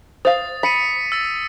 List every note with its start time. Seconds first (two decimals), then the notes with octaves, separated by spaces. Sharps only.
0.25 C5 F5 D#6 A6
0.63 B5 B6 C#7 D#7
1.12 E6 A6